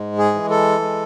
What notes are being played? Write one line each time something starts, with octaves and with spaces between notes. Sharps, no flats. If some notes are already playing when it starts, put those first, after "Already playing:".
Already playing: G#2 G#3
G#4
E3
A4
G#3